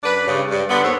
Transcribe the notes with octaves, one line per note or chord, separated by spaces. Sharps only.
F#2 D4 B4
G2 C#3
G2
D3 B3
D#2 A4 C5 C#5 E5